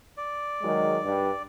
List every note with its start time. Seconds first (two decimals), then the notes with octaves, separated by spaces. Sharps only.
0.17 D5
0.62 D#3 F#3 G#3
1.04 G2